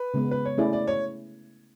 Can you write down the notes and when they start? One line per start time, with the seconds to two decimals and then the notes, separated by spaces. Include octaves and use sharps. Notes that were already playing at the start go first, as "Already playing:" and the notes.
Already playing: B4
0.14 C#3 G#3 B3
0.31 B4
0.45 C#5
0.58 A3 C#4 E4 G#4 D5
0.73 D5
0.88 C#5